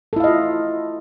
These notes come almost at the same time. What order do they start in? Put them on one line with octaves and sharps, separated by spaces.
A4 E4 F5 D#5 F4